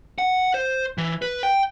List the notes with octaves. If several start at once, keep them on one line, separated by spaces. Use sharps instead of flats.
F#5
C5
E3
B4
G5